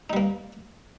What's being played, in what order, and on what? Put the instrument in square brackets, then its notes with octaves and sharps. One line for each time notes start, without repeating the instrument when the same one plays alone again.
[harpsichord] D#4
G3
A#3